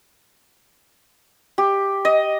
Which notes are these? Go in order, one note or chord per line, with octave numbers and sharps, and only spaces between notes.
G4
D#5